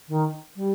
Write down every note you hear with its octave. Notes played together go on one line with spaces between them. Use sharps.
D#3
G3